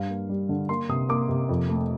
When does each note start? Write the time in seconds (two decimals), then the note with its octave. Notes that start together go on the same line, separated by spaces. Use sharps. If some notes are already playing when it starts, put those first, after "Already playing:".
Already playing: G2 F5
0.10 A#3
0.29 G3
0.49 D3
0.69 A#3 C6
0.89 C3 D#6
1.09 A#3 D6
1.29 C3
1.49 F2
1.69 A3